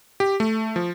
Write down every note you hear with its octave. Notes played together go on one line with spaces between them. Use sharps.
G4
A3
F3